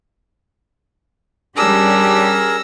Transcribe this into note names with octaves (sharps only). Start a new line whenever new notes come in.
G3 C#4 D4 G4 G#4 A#4 E6 A#6